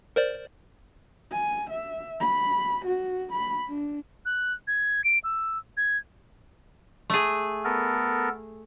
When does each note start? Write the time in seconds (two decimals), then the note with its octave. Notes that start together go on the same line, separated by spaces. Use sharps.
0.16 A#4 C5 D5
1.31 G#5
1.70 E5
2.20 B5
2.86 F#4
3.33 B5
3.68 D4
4.26 F#6
4.68 G#6
5.04 D7
5.24 E6
5.77 G#6
7.10 A3 G#4
7.65 B3 A4 A#4